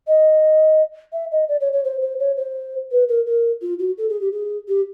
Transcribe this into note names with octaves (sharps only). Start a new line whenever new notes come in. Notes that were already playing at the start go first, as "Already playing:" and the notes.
D#5
E5
D#5
D5
C#5
C#5
C5
C5
C#5
C5
B4
A#4
A#4
F4
F#4
A4
G#4
G4
G#4
G4